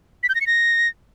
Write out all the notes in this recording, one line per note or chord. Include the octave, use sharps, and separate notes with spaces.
B6
G6
A#6
C#7
A#6